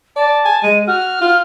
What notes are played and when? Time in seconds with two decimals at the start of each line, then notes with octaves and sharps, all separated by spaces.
0.16 D5 A5
0.45 G#5
0.63 G#3 D#7
0.87 F#4 F6
1.21 F4